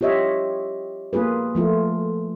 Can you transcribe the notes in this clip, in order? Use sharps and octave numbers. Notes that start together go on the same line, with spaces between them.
F4 G4 C#5 D#5 E5
A#3 F4 G#4 B4
F3 A3 F4